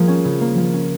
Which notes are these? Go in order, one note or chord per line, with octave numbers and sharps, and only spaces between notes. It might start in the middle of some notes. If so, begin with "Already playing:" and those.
Already playing: F3 A#3 G#4
C#4
C#3
A#3
F3
C#4